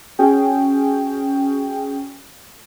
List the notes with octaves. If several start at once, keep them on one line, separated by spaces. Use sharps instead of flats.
C#4 F#4 G#4 G5